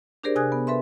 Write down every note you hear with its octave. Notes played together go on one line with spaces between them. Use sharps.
D4 G4 G#4 A#4 C5 D5
C3 G#5 D#6 F#6 G#6
B3
A4 B4 E5 C6